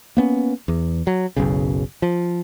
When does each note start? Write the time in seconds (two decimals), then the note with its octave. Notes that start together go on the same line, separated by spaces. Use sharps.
0.17 A#3 B3 C#4
0.68 E2
1.07 F#3
1.37 F#1 B1 C#3
2.02 F3